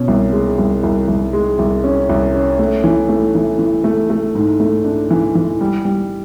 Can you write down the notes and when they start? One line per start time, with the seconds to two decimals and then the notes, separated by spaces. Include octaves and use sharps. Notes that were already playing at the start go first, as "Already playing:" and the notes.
Already playing: B2 C#4
0.08 C2
0.32 G#3
0.58 C2
0.83 C2
1.08 C2
1.33 G#3
1.59 C2
1.84 C#4
2.09 C2
2.34 C#4
2.59 A3
2.84 E3
3.09 A3
3.35 E3
3.59 E3
3.84 A3
4.10 A3
4.35 G#2
4.60 A3
4.85 D4
5.11 E3
5.35 E3
5.61 G3
5.85 G3